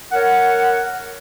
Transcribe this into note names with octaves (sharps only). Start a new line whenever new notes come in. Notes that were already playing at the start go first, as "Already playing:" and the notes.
A#4 C#5 F#5